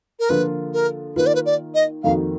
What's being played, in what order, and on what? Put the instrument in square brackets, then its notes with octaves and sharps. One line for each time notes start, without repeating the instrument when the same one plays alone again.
[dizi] A#4
[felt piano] D3 F3 A#3 F4 [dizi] B4
[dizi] A#4
[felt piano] D#3 A#3 F4 [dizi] B4
[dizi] D5
B4
D5
D#5
[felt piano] F2 D#3 A#3 D#4 F#4 [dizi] F5